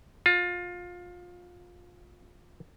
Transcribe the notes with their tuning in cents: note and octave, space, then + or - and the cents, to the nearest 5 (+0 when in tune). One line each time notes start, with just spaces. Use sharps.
F4 +20